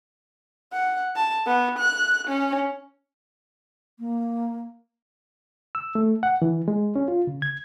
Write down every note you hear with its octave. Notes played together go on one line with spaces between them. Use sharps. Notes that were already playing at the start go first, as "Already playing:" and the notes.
F#5
A5
B3
F#6
C#4
A#3
E6
A3
F#5
E3
G#3
C#4
F4
C#3
G#6